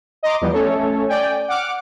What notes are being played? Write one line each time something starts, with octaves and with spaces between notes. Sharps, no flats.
D#5 A#5 C6 D6
E2 F3 G3 B3
A3 C#4 A4 C#5
D5 G5 G#5
F#5 D6 F6